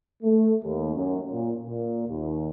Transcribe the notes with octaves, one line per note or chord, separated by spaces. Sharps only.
A3
D#2
F#2
A#2
A#2
D#2